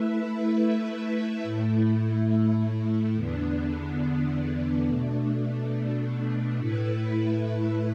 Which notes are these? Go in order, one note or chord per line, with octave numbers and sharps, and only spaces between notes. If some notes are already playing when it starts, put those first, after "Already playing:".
Already playing: A3 E4 B4 E5
A2 A3 E4
E2 D3 B3 D4
B2 A3 D4
A2 A3 E4 B4